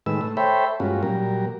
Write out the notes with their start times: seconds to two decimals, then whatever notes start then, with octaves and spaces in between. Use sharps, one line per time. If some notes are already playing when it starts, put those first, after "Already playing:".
0.06 A2 D#3 G#3 B4 E6
0.21 A3
0.37 A4 C5 C#5 E5 G5 B5
0.80 G2 G#3 A#3 C#4 F4 F#4
1.03 A#2 F#3 G3 A#4